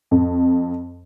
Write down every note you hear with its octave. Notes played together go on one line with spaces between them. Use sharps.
F2